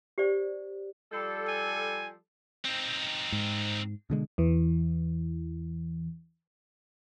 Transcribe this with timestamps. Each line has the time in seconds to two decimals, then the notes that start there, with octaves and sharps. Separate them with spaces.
0.18 G4 C5 D5
1.12 F3 G3 A4
1.48 G#5
2.65 C4 D#4
3.32 G#2
4.10 B2 D3 G#3
4.38 E2 E3